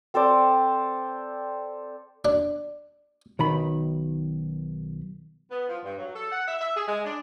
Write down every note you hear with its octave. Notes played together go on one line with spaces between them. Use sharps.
C4 A4 C5 D5
D4
B1 D#3 B5
B3
F3
G2
F#3
A4
F#5
E5
E5
G#4
G#3
D4